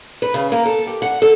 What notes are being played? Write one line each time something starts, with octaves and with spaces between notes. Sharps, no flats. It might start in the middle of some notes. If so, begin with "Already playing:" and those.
B4
C#3
A#3
A4
G4
F#5
A4